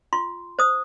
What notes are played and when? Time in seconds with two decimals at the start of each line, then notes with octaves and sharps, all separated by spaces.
0.13 F4 C6
0.59 C5 D#6